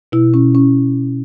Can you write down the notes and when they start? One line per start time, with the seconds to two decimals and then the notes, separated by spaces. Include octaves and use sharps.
0.12 B2 E4
0.34 B2 C#4
0.55 C#4